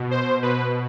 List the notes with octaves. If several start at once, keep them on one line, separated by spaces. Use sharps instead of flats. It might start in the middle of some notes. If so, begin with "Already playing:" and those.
Already playing: B2
C5
B2 B4